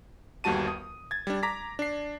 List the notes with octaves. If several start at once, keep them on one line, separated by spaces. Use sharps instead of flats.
G1 D#2 G3 F#4 A5 D#7
D#6
G#6 A6
G3 D4
A#5 D6 A#6 B6
D4 C7